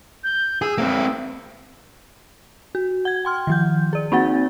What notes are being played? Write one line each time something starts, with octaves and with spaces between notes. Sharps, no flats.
G6
G#4 E6
A#3 C4
F#4
F#5 G#6
G5 C6 F6
D#3 F3 G6
G#4 D5
A#3 C4 D#4 F#4 F#5 A6